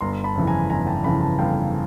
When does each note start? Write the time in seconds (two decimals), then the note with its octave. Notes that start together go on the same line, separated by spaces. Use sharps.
0.01 G1 A#5 C6
0.24 A5 B5
0.36 F2 C#3 E3
0.47 G#5 A#5
0.69 G1 G#5 A#5
0.87 G5 A5
1.03 F2 C#3 E3 A5 B5
1.21 A5 B5
1.38 G1 F5 G5